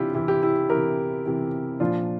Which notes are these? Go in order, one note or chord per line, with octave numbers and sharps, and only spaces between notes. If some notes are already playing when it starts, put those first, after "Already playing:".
Already playing: C3 E3 D4 E4 F4 G4
C3 E3 E4 G4
E4 G4
E4 G4
E3 G4 A#4
C3
C3 E3
A#2 F3 D4 F4